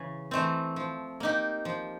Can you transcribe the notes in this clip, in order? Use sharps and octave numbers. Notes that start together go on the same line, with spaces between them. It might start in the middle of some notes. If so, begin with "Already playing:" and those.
Already playing: C#3 E3
E3 A3 C4
F3
A#3 D#4 G4
F3